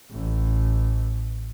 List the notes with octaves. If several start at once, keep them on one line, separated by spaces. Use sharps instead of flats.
A1